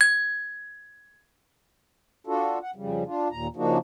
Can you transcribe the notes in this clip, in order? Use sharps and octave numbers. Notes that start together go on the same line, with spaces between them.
G#6
D4 F4 F#4 A4
F#5
F2 C#3 G3
D4 F4
D#2 A#2 A#5
C#3 F3 A#3 D4 D#4 F#4